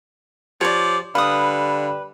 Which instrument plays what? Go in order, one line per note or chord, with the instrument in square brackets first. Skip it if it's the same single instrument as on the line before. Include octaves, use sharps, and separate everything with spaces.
[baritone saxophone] F3 [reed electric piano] G4 [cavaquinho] C#5 D5
[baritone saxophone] D3 [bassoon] G3 [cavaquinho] B4 D#6 [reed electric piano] F5 B5 F6